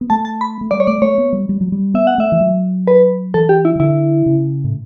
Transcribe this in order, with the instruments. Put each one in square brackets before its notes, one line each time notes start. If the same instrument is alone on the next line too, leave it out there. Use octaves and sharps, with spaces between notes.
[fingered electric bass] B3
[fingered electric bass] A3 [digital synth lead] A5
[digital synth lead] A5
B5
[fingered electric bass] A3
[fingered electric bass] G3 [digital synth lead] D5
[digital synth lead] C#5
[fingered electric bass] A3 [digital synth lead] D5
[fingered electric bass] A3 [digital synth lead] C#5
[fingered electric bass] B3
G3
G3
F#3
G3
[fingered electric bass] B3 [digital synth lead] E5
[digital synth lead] F#5
[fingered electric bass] A3 [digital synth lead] E5
[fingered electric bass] E3
F#3
[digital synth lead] B4
[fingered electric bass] E3 [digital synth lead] A4
[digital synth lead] G4
E4
[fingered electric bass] E3
[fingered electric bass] D3 [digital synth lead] E4
[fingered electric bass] C#3
A2